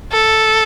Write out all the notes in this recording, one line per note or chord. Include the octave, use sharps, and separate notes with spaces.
A4